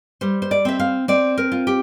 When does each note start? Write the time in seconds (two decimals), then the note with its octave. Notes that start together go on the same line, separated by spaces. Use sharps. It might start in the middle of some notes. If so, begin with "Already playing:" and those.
0.21 G3 C5
0.42 C5
0.51 D5
0.65 C4 E5
0.79 F5
1.08 C4 D5
1.38 A#4
1.52 F4
1.67 G4